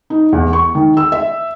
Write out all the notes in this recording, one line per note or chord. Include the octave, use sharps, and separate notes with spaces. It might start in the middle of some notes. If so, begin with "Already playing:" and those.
D#4
E2
C#6
D#3
E6
E5